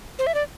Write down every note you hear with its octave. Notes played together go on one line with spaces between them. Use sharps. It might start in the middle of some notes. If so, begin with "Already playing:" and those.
C5
E5
D5